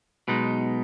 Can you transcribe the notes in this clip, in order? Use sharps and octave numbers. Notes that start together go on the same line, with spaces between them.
B1 B2 G#3 B3 D#4